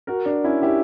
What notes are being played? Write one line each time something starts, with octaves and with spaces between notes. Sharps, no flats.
F#4 A#4
D4 F#4
C#4 E4
E4 G4